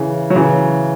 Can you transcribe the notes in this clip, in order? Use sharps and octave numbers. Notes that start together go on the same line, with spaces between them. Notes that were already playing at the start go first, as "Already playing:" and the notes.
Already playing: C#3 E3
F#3
C#3 E3